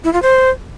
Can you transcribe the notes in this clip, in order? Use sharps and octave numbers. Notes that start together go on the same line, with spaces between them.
E4
F4
C5